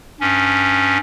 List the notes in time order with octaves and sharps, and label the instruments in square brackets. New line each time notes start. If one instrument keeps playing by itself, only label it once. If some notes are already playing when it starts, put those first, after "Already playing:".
[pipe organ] G2 C#4